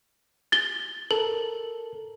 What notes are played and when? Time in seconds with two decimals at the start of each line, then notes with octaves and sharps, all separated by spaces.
0.52 A6 G7
1.11 A4 A#4 F#7